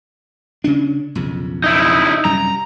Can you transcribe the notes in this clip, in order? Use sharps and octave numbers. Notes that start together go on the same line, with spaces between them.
C#3 C#4 D4
B1 F2 C#3
D#4 E4
F#2 C3 G3 A#5